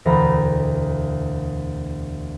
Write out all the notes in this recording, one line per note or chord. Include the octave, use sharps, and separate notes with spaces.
E1 D2 D3 A#5 B5